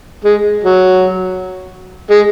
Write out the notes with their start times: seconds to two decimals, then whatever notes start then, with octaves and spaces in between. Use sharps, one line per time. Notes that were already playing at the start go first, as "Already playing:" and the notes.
0.24 G#3
0.64 F#3
2.10 G#3